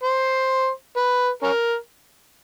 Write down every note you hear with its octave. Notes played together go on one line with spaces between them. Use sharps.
C5
B4
C#4 A#4